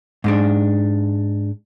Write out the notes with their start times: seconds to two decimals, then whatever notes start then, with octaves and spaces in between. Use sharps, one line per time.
0.24 G#2 G#3 D4